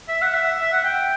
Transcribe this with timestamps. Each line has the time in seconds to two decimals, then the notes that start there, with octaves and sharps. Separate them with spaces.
0.08 E5
0.22 F#5
0.34 E5
0.60 E5
0.72 F#5
0.84 G5